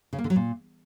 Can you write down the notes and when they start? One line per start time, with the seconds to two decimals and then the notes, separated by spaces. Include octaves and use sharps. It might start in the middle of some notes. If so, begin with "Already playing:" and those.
0.13 C#3
0.18 A#3
0.24 D3
0.30 F#3
0.36 A#2